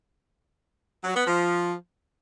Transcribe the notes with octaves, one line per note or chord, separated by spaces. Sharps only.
F#3
B3
F3